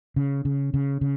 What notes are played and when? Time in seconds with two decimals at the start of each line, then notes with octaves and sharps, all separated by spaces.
0.16 C#3
0.45 C#3
0.74 C#3
1.01 C#3